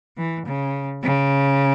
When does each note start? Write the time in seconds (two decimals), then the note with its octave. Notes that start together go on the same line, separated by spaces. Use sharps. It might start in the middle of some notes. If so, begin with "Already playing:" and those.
0.18 E3
0.46 C#3
1.03 C#3